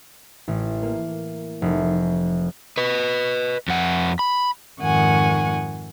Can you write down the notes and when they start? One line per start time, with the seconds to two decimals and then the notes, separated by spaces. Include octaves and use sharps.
0.48 A1
0.82 A#3
1.62 F1
2.78 B4 D#5
3.68 F2 F#5
4.19 B5
4.80 F2 G#2 D#3 F#5 G#5 C#6